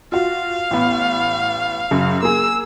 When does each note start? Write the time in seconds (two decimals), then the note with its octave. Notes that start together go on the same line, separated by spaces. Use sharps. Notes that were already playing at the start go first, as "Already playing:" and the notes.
0.12 F4 F#4 F5
0.71 A1 B3
1.91 F#2 C#3
2.23 A#3 G#4 E6